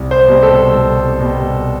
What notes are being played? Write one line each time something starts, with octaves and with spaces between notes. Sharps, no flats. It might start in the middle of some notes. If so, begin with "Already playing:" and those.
Already playing: C2
C5
B2 G3
A4
C2
B2 G3